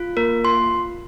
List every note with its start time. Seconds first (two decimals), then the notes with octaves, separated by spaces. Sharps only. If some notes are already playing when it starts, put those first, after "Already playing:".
Already playing: F4
0.17 A#3 A#4
0.44 F4 C6